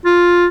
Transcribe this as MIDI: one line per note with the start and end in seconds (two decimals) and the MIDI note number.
0.05 0.46 65